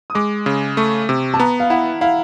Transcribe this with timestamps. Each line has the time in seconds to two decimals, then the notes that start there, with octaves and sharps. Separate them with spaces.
0.10 D#6
0.15 G#3 D6
0.46 C#3
0.77 A3 C#6
1.09 C3
1.34 A5
1.39 B3 A#5
1.60 F5
1.70 E4 F#5
2.01 E4 F5